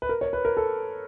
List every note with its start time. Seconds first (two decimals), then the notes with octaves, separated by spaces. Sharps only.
0.02 B4
0.09 A#4
0.21 C#5
0.33 B4
0.45 A#4
0.57 A4